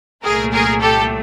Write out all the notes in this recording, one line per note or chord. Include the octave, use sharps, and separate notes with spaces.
C2 A#2 F#3 A3 G#4 A#4
G#4 A#4
G4 A4